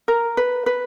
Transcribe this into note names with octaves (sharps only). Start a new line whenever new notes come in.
A#4
B4
B4